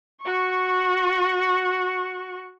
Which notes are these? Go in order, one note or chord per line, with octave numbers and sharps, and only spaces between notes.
F#4 C#6